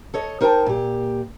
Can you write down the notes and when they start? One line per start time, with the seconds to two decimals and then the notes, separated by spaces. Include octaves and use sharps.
0.14 A4 C#5 D#5
0.41 D#4 A#4 C5 E5 G5 A5
0.66 A#2 G4